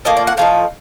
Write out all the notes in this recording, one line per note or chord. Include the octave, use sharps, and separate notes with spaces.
A2 F3 A#3 D#5
D5
F#5
A2 F3 D#4 F5